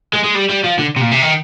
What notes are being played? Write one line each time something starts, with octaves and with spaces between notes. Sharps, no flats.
G#3
G#3
G3
G3
F3
D3
C3
A#2
C3
D#3